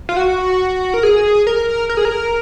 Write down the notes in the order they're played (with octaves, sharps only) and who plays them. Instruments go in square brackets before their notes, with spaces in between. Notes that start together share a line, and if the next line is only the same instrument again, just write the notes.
[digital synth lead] F4
F#4
A#4
G#4
A#4
A#4
G#4
A#4